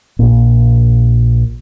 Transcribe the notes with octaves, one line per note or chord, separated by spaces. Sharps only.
A#1 A#2